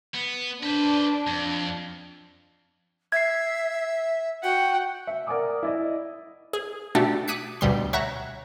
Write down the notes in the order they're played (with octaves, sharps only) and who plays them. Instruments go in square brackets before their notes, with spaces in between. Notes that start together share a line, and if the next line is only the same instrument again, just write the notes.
[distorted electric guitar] B3
[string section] D4 [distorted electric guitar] B4 C5
[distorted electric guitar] F2
[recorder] E5 [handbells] G#6 C7
[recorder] F#4 [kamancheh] F#5 G5
[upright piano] E5
A#4 D5 F#5 G#5 D6 D#6
E4 D5 D#5
[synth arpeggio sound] G#4
B2 A3 D4 F#4 G4 A4
D6 D#6 F#6 G#6 B6 C#7
D2 B2 G3 C6
C#5 E5 F#5 A#5